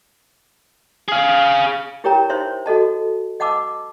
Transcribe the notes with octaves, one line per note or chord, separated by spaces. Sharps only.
G#4 F5
E4 G4 A#4 C#5 G5 A#5
D#4 C5 C#5 E5 C6
F#4 A4 D#5 A5
D#5 F#5 A5 D6 E6